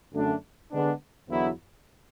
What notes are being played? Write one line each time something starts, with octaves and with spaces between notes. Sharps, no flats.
F#2 D3 A3 D4
D3 G#3 B3 D4
E2 D3 F#3 B3 E4